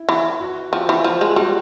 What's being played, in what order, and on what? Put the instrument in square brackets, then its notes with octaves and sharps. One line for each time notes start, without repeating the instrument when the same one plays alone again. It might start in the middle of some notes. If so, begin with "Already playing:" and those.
Already playing: [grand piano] E4
[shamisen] E3
[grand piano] F#4
[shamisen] F3 [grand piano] G4
[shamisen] E3
F3
G#3
[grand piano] F4
[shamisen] G3 [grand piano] F#4